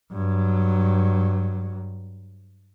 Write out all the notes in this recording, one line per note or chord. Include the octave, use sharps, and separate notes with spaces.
G2 F#3